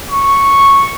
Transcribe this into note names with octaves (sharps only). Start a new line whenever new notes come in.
C#6